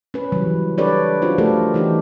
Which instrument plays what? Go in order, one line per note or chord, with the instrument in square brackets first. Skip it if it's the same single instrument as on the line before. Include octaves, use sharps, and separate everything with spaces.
[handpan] C#4 B4
C#3 E3 F#3 G3
D4 G4 A4 B4 C#5 D5
C#4 D4 F4 F#4 C5
F3 A3 F4 G4 A4 A#4
E3 D#4 G4